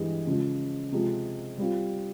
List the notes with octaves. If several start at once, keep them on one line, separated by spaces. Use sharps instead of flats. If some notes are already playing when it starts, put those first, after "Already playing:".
Already playing: G2 E3 G#3
C#3 F3 G#3
C3 F3 G#3
G3 C4 F4